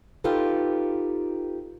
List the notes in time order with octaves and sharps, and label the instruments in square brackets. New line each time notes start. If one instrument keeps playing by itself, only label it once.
[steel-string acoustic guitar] D#4 F4 G4 A4 B4